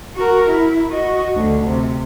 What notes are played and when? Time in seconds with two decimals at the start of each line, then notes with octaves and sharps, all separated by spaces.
0.16 F#4 A#4
0.49 E4
0.91 F#4 D#5
1.35 D2 D3
1.67 C3